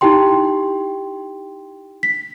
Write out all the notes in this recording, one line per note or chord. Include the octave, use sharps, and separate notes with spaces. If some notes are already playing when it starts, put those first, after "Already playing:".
D#4 E4 G4 G5 C6
B6